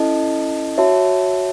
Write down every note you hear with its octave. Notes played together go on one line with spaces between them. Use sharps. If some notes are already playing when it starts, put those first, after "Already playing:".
Already playing: C#4 E4 A4 D#5 A5
F#4 C#5 E5 A5